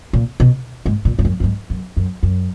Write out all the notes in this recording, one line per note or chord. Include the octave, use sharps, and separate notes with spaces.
A#2
B2
G#2
A#2
G#2
F#2
F#2
G#2
F#2
F#2
F#2